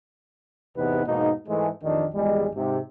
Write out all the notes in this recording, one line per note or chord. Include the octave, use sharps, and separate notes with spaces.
A1 E2 C3 B3 D#4 B4
E2 G#2 B2 A#3 D#4
G#2 E3 G#3 A3
A1 F2 D#3 D4 D#4
G#1 E2 G3 G#3
G#2 C3